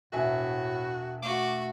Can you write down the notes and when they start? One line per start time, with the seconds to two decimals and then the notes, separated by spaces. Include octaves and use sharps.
0.12 E1 A2 F#4 E5 G#5
1.23 A3 F#4 D6